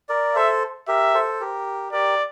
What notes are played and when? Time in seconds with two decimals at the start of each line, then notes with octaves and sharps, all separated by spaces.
0.09 A#4 D5
0.35 A4 C5 E5
0.88 G4 A#4 E5
1.14 A4 C5
1.40 G4 A#4
1.92 G4 A#4 D5